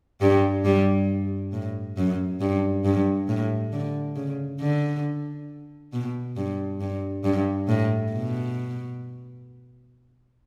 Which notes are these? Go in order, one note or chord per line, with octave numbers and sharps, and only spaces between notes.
G2 G3
G2 G3
A2
F#2
G2
G2
A2
D3
C#3
D3
B2
G2
G2
G2
A2
B2